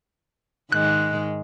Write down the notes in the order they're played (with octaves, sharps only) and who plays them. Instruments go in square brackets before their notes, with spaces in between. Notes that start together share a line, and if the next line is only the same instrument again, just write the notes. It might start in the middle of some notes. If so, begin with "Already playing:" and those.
[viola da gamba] G#2 D#3 G#3 [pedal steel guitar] F#6